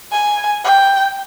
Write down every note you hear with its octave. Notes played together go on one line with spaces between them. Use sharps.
G#5
G5